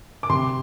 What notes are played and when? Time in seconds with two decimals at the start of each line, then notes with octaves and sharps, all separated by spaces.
0.23 D6
0.29 C3 C6